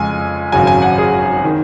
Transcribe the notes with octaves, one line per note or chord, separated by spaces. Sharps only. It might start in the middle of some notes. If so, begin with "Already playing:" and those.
Already playing: F2 C#3 G#3 G#5
G#1 F#2 C#3 F#3 G#5
G#5
F#5
G#4
D#3